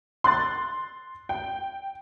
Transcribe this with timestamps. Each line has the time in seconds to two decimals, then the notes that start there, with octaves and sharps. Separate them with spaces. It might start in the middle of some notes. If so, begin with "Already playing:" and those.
0.24 C6 F#6 A6
1.29 G5